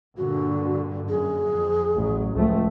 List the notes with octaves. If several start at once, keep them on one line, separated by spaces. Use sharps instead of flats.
G2 A#2 D3 F#4
F#2 G#4
F2
A1 F#3
C#2 F3 A3